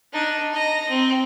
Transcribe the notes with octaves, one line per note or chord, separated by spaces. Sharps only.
D4 D#4
D#5 A#5
C4